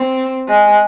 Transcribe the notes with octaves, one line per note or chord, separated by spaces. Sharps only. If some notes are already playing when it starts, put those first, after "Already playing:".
Already playing: C4
G#3